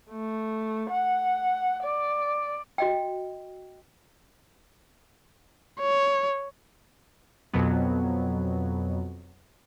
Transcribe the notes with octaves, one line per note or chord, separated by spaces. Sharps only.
A3
F#5
D5
F#4 D#5 G5
C#5
F2 B2 F#3 B3